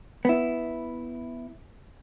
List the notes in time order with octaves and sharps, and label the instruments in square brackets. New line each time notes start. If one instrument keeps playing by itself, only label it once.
[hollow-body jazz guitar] B3 E4